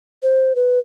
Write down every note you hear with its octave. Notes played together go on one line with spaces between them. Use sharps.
C5
B4